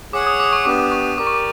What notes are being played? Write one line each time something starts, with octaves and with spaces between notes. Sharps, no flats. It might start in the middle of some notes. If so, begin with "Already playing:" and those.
G#4 C#5 F#5 D6
D#6
D6
C#6
B3 D4 G4 D6
C#6
G4 A#4 D5 D6
C#6
D6